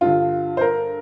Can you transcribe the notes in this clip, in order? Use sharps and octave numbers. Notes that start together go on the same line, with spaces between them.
G2 D3 F4
C5
A#4